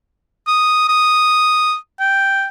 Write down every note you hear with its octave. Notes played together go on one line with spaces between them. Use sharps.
D#6
D#6
G5